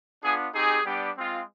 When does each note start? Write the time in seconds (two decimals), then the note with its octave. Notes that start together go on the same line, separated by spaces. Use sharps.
0.23 B3 D4 F4 G#4
0.54 C4 D#4 G4 G#4
0.85 G3 B3 D4 G4
1.17 G#3 C4 F4